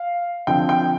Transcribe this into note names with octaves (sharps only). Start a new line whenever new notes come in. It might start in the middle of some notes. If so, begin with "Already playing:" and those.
Already playing: F5
D3 F3 C4 G5
G5